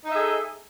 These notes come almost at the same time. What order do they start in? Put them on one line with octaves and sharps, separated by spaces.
D#4 D#5 E5 G#4 A4